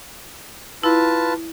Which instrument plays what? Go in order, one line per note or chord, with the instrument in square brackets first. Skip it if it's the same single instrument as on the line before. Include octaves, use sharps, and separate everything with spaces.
[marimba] E4 [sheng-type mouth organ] F4 B4 A5